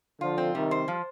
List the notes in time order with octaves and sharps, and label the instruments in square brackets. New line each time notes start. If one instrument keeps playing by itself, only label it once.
[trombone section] D3 F3 [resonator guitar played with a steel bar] F4
[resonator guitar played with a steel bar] C4
[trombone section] C3 D#3 [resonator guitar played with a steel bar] G3
[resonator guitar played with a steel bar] C5
F3